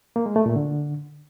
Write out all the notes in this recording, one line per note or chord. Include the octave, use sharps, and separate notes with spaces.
A#3
G#3
A3
A#2
D3